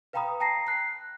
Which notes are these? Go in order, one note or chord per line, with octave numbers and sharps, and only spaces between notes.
B4 F5 G5 A#5 B5 D#6
G5 A5 A#5 A#6 C7
F#6 C7